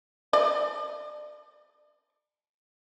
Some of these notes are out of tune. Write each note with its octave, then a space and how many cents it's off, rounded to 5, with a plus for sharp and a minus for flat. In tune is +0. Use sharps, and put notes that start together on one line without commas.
D5 +35